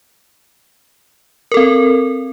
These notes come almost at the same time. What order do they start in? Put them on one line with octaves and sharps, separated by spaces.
A#4 A4 C4